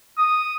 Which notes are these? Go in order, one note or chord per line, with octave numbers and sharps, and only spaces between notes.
D#6